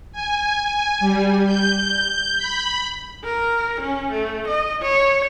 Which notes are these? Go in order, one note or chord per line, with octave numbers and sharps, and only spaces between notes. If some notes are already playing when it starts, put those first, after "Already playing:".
G#5
G3
G6
B5
A#4
C#4
A3
D#5
C#5